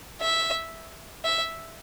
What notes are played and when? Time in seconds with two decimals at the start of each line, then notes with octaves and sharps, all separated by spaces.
0.21 E5
1.25 E5